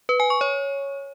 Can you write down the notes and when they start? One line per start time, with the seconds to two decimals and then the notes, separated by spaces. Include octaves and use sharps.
0.09 B4
0.20 G#5
0.30 C#6
0.41 C#5